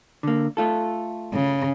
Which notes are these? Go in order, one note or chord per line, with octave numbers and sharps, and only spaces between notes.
D3 A#3
A3 F4 A4
C#3